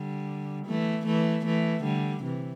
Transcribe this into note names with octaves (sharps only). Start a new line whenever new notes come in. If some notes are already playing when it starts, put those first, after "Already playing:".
Already playing: D3 G3
E3 A3
E3 A3
E3 A3
D3 G3
C3 E3